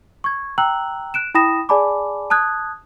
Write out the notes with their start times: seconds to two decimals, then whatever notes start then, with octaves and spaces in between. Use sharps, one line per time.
0.24 C#6 G#6
0.58 G5 A#5 E6 F#6 F#7
1.14 F#6 D7 E7
1.35 E4 G5 B5 D#6 A#6 E7
1.69 G#4 D5 G#5 A5 B5 D6
2.30 A5 D#6 F#6 G#6